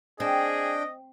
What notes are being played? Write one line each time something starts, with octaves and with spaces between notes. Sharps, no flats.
C4 D4 G#4 D#5 G5